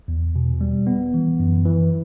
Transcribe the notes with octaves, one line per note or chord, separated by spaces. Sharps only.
E2
B2
G3
B3
E3
F#2
E3